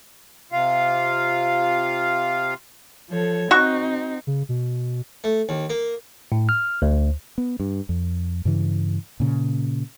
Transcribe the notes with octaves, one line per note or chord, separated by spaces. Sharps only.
C3 F4 F5
F3 A4 C#5
C4 D#4 F#4 C#6
C#3
B2
A3
D#2
A#3
A2
F6
D2
B3
G2
F2
G2 C#3 E3
A#2 C#3